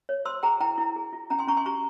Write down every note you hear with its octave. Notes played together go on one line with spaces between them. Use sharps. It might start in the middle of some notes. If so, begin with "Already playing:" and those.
C#5
C5 C6 E6
G#4 G5 A#5
E4 G5 A#5
E4
G#4
F4
C#4 G5 A#5
G#5 C6
C#4 A#5 C#6
G#5 C6
G4 A#5 C#6